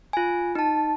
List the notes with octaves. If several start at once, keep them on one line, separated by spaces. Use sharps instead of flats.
F4 G#5
D#4 A5